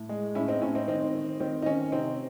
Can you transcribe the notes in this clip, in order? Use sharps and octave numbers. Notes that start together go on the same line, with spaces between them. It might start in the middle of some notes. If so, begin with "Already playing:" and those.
Already playing: A2
G#3
A2 C#4 E4
C4 D#4
A2 C#4
C4 D#4
D#3 C4 D#4
D#3
D#3 C4
D#4
D#3 C#4
C3 C4 D#4